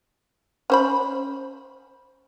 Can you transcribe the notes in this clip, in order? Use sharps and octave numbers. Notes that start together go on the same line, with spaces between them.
C#4 C5 B5